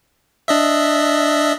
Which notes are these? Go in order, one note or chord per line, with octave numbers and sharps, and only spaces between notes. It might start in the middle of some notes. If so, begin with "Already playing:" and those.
D4 D#5 E5